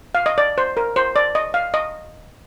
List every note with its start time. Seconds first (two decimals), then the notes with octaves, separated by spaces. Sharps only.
0.15 F5
0.26 D#5
0.38 D5
0.58 C5
0.77 A#4
0.96 C5
1.16 D5
1.35 D#5
1.54 F5
1.74 D#5